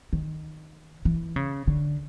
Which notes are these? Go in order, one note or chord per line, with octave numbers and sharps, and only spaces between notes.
D#3
E3
C#3
D3